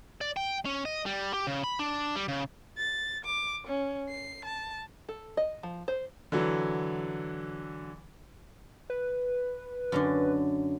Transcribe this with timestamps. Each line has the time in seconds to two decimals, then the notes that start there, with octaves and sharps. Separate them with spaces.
0.21 D5
0.37 G5
0.65 C#4
0.85 D#5
1.06 G3
1.34 G4
1.47 C#3
1.64 B5
1.79 D4
2.16 G3
2.28 C#3
2.77 A6
3.25 D6
3.67 C#4
4.09 C7
4.45 A5
5.09 A4
5.37 D#5
5.63 F3
5.88 C5
6.32 D3 E3 F#3
8.90 B4
9.92 F#2 D3 D4